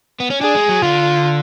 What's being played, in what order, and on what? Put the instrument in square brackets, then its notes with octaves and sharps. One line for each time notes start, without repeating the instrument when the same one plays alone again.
[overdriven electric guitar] B3
C#4
[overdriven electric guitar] D4 [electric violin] G#4
[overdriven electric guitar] G#3
F#3
[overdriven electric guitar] D3 [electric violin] F4